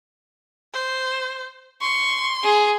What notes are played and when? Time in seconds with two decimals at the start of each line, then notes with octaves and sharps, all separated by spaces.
0.74 C5
1.82 C6 C#6
2.44 G#4